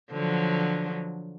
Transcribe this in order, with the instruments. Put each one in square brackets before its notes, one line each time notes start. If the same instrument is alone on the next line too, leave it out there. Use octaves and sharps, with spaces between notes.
[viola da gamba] D3 F3 F#3